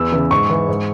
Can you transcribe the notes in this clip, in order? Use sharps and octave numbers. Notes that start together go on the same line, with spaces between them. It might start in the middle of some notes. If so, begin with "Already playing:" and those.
Already playing: E2 E6
C#3 E3
G#2 C#6
E3
G#2